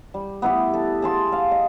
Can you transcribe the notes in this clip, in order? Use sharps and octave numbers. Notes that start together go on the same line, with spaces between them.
G3
B3 E4 G4
A4
G#4 A5 C6
F5
D#5